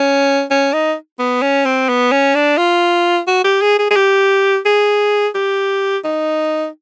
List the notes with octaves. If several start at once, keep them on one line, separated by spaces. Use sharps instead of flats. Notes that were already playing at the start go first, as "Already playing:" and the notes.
Already playing: C#4
C#4
D#4
B3
C#4
C4
B3
C#4
D4
F4
F#4
G4
G#4
G#4
G#4
G4
G#4
G4
D#4